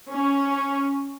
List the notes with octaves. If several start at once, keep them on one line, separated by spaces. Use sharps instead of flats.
C#4